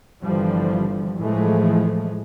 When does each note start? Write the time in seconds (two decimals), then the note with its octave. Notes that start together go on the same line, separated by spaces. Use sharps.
0.23 G1 D3 E3 F3 G3
1.18 A2 E3 F3 G#3 A3